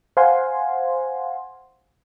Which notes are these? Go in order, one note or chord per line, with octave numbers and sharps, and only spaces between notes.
C5 F5 F#5 G#5 C6